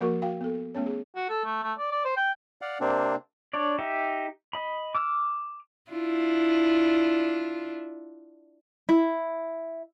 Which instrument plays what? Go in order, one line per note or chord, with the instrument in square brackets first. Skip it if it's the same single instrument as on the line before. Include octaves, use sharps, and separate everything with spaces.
[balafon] F3 A#3 F#4 A#4 C#6
F#4 F5 G5
B3 A4
A3 B3 C#4 C#5
G#4
[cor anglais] F#4
A4
A3
A3
D5
D5
C5
G5
[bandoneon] D5 F5 F#5
C3 A#3 C4 D4
[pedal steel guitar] D4 C#5 D5
D#4 G4 E5
D#5 B5
D6 E6 F6
[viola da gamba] D4 E4 F4
[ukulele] E4